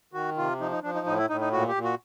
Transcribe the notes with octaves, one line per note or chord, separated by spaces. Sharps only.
D#3 F#4
C3 F4
F3 D#4
D#4
F3 D4
D#4
A2 D#4
E4
A2 D#4
D#4
A#2 F#4
G4
A#2
F#4